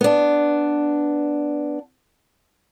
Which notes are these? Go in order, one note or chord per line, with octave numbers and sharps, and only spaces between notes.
B3 D4